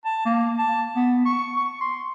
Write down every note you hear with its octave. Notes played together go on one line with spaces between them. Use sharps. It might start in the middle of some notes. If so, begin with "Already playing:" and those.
A5
A#3
A5
B3
C#6
C#6
C6